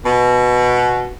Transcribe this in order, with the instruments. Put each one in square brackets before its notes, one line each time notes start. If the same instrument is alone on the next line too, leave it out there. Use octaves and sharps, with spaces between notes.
[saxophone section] B2